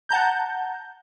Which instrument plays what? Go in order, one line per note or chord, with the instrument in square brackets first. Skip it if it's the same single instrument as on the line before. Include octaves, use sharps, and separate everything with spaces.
[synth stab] F#5 A5 A#5 G6